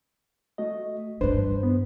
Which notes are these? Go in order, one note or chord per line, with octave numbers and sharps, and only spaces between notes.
A3 F#4 D#5
G2 D#3 D4 B4 C5
B3